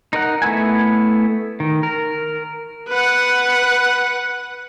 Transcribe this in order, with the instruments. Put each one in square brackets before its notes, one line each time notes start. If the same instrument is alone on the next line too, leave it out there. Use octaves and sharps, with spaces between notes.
[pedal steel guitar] D#4 A#4 F#5
A3 B3 E4 G#5
D#3
A#4
[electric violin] B4 F#5